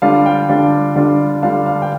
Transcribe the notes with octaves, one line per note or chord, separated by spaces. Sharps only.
D3 G3 D4 F4 F5
G5
D3 G3 D4 F4
D3 G3 D4 F4
D3 G3 D4 F4 F5
F5
G5